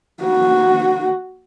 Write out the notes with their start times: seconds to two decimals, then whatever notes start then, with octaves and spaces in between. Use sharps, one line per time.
0.24 F#4